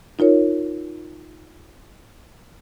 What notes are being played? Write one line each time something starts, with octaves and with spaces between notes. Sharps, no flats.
D#4 F4 A#4 C#5